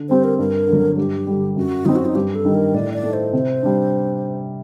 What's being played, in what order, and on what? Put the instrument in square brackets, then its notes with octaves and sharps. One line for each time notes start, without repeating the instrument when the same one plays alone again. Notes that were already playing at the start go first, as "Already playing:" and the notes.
Already playing: [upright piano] D3
[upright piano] G3 C4 G4 [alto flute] C5
[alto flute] A#4
[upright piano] G2 [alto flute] A#4
[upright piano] D3
F#3
[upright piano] G2 [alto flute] G4
[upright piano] D3 G3
[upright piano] F#2 [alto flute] F#4
[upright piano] F#3 C4 [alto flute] D#4
[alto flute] F#4
D#4
[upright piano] G2 [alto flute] G4
[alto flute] A4
[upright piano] D#3 G3 D4
[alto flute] A#4
[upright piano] A2 [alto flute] D5
[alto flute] D5
[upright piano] A3 D#4
[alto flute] C5
[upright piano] C3
G3 D4